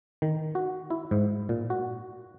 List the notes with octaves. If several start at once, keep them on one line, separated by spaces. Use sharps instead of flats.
D#3
F#4
E4
G#2
A#2
F#4